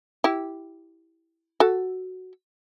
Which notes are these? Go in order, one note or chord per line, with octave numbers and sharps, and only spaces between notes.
E4 G4
F#4 A4